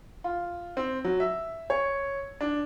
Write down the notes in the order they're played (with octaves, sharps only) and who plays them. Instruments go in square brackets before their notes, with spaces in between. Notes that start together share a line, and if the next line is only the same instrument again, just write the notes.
[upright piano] F4
C4
F#3
E5
C#5
D4